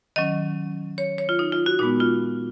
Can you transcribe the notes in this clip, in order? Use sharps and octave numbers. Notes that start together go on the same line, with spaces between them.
D#3 F#3 C#4 D#5
C#5
C#5
F4
D#4
F4
F#4
A#2 G#3 B3 D#4
F4